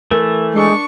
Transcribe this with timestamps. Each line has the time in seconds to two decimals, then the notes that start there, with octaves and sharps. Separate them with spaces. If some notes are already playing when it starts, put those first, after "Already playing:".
0.11 E3 A3 A#4
0.53 G#3 D4 C#6